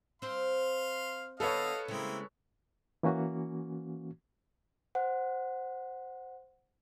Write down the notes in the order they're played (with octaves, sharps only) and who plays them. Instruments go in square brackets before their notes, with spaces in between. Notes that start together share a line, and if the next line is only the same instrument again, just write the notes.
[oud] C4 C5 [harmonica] F5 C6
[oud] D3 B3 [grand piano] A4 B4 C#5 [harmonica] D#5 F5 A5
[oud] C#3 G#3 [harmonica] A#3 C4 E4
[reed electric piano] E3 A#3 C#4 F#4
[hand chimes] C5 F#5